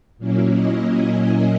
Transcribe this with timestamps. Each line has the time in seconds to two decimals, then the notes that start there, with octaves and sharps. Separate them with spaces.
0.18 A#2 F#3 A#3 C#4 E4
0.51 D#5
0.84 G#5